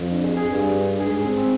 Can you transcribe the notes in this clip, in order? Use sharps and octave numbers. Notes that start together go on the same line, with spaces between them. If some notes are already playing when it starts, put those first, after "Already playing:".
Already playing: F2
D4
G#4
G#4
G2
G#2 G#4
G#4
C4
C4